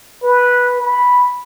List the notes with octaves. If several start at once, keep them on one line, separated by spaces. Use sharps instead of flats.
B4
B5